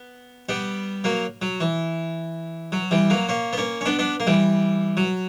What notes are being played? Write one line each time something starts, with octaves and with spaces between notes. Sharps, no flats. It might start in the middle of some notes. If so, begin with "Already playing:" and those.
Already playing: B3
G3 B3
F#3 A#3
F#3
E3
F#3
E3 G3
F#3 A#3
A#3 C#4
B3
A#3 C#4
C#4
B3 D4
B3 D4
A#3
E3 G3
F#3